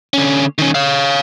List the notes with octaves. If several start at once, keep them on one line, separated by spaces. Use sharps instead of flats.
D3 C#4
D#3 C#4
C#5 F5